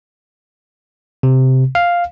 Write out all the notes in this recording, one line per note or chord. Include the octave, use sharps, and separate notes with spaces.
C3
F5